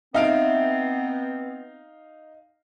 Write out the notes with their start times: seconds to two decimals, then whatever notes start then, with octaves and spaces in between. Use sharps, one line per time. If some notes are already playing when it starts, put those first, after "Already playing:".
0.14 B3 C4 D#4 E5 F5 D7